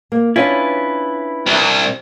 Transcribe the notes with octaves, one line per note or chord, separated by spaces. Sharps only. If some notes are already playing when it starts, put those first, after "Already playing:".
A#3
C#4 D4 E4 F4 B4
C2